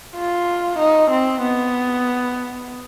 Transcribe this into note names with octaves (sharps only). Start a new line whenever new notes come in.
F4
D#4
C4
B3